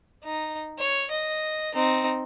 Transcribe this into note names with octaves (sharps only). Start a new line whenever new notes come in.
D#4
C#5
D#5
C4 D#4